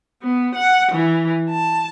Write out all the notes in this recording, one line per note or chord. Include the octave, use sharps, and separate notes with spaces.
B3
F#5
E3
A5